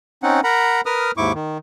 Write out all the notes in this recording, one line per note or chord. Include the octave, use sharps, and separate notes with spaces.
C4 C#4 D#4 F#5
A#4 F#5 A#5 B5
A#4 B4 D#6 F6
D#2 G#2 E4 C#6 D6
D#3